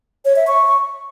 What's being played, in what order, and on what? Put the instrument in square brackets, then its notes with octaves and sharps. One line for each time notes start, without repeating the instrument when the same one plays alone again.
[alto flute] C#5
E5
C#6